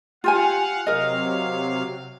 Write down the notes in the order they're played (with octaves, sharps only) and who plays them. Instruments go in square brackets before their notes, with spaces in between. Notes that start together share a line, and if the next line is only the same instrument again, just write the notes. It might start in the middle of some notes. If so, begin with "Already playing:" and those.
[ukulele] F4 G4 G#5 [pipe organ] F5 F#5
[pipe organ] C3 F#3 F5 [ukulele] A#4 D#5